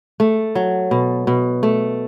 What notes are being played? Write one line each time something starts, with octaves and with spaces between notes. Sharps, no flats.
A3
F#3
B2
B2
A3